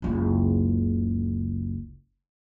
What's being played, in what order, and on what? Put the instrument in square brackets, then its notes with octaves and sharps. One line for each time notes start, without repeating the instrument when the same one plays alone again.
[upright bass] F#1 C#2